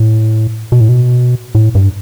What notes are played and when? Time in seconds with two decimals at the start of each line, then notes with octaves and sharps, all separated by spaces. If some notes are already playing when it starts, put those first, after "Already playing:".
Already playing: A2
0.72 B2
0.80 A2
0.89 B2
1.55 A2
1.75 G2